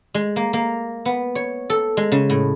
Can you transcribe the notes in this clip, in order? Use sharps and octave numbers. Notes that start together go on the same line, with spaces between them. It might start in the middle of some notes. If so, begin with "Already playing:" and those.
G#3
A#3
A#3
B3
C#5
A4
G#3
C#3
A2